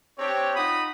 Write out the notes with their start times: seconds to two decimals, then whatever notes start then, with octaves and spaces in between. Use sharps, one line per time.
0.18 C4 D4 G4 C#5
0.55 D#4 F4 F#5 B5 D#6